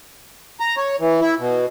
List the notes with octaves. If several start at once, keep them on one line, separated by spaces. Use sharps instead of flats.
A#5
C#5
E3
E4
B2